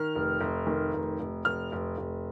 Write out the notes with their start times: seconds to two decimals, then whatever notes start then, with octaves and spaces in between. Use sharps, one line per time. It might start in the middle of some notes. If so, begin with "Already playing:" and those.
Already playing: D#3 F6
0.16 F1
0.41 F1
0.67 D#3
0.94 F1
1.20 F1
1.45 F1 F6
1.72 F1
1.98 F1